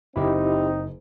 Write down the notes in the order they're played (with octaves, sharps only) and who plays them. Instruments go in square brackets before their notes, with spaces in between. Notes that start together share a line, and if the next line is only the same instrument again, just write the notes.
[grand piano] F#1 [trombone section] C4 D#4 [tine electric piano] E4 G4 D#5